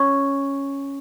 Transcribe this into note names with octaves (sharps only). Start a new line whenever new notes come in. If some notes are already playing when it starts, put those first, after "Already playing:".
Already playing: C#4